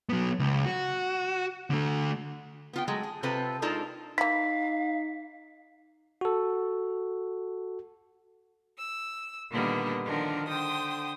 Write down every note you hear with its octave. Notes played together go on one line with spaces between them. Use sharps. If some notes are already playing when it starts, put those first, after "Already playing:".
F#3 B3
C#2
F#4
D3 A3
B3 F4 G5
F#3 G#3 A3
G#4
C3 C4 F4 A4 B4
G#3 D4 D#4 F4 A4 A#4
A#3 D#4 E4 F5 B6
F#4 A4
E6
A#2 D3 D#3 G3 A#3 B3
D3 D#3 F3 D4 A#4
D3 C5 G5 D#6